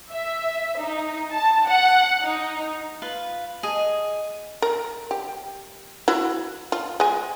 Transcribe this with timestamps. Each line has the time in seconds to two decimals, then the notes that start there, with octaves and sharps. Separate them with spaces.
0.11 E5
0.80 D#4
1.33 A5
1.68 F#5
2.22 D#4
3.02 F4 B4 F5
3.63 G#4 D#5
4.62 A#4
5.11 G4
6.08 E4 F#4
6.72 F4
7.00 G#3 G#5